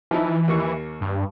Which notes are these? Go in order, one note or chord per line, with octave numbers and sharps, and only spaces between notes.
E3 F3 D#4 E4
D#2 A#3 C#6
G2